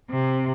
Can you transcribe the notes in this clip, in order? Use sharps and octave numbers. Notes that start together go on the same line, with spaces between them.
C3